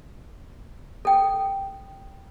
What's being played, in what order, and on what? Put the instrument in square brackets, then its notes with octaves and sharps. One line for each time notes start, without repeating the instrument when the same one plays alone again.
[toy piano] A4 G5